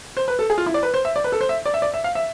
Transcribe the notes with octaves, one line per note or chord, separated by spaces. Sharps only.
C5
B4
A4
G#4
F4
E4
D5
B4
C5
E5
D5
B4
A4
C5
E5
D5
E5
D5
E5
F5
E5